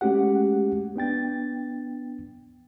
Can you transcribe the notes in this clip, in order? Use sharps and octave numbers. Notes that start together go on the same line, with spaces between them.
G#3 A3 C#4 F#4 G4 F#5
B3 D4 G5 A6